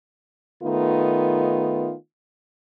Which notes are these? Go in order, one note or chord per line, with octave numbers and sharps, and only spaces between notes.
D#3 A3 B3 D#4 F4